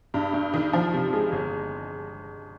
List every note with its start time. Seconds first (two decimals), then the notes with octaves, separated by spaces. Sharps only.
0.14 G2
0.34 G2
0.54 D#3
0.73 F3
0.93 C3
1.13 G#3
1.32 G1